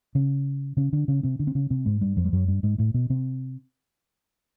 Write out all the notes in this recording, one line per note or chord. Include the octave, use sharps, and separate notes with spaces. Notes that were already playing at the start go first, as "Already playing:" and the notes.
C#3 C#4
C#3 C#4
D3 D4
C#3 C#4
C3 C4
D3 D4
C4
C#3 C#4
C3 C4
G#2 G#3
G2 G3
F2 F3
G3
F#2 F#3
G2 G3
G#2 G#3
A2 A3
B2 B3
C3 C4